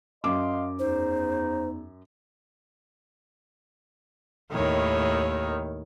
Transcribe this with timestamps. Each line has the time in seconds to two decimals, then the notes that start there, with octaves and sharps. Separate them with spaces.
0.24 F#2 D#5 F5 C6 D6
0.79 E2 D#4 C5
4.52 D#2 A2 D#3 C#5